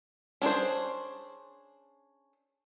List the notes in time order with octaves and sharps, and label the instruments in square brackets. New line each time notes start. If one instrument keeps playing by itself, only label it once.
[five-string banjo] C#4 D4 G#4 C5